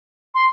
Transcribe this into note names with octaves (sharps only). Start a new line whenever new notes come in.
C6